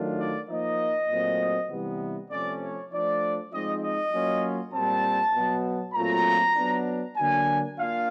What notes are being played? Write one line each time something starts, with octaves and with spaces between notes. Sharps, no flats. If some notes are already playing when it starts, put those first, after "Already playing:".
Already playing: D#3 F#3 A3 D4 F4
D5
F3 A#3 D#4 D#5
A#2 F#3 A3 C4
C3 E3 G3 B3
C3 F3 A3 C#4 D5
C#5
F3 A3 D4 D5
F3 G#3 C4 D#4 D#5
D#5
F#3 A#3 C#4 F4
A#2 G3 C4 A5
B2 F#3 B3
A#2 F#3 A3 C4 F4 A#5
F#3 B3 D4
D3 F#3 A#3 D4 G#5
A#3 D4 F4 F5